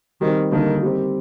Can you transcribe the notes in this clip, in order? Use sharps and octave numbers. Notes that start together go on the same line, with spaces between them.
D#3 G3 C4 G4
D3 D#3 G3 A#3 D4 A4
G3 C4 G4